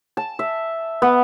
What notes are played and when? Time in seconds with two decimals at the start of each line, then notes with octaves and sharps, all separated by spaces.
0.17 A5
0.39 E5
1.02 B3